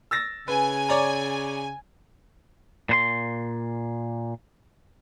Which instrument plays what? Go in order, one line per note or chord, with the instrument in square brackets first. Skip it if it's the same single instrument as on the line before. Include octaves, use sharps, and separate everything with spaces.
[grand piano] E6 A6 A#6
[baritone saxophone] C#3 [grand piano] B4 [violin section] G#5
[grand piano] C#5 D5 A#5
[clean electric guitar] A#2 C5 C6